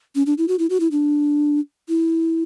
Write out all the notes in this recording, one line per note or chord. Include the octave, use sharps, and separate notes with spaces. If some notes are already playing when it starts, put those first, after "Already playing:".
C#4
D4
E4
F#4
E4
F#4
E4
D4
E4